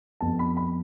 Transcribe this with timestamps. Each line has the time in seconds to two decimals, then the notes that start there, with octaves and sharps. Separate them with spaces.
0.21 F2 F3 B3 A5
0.39 B5
0.57 B5